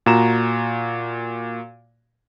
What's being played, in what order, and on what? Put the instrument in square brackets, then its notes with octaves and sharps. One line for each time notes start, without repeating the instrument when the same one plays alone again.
[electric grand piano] A#2 F#4 A#5 E7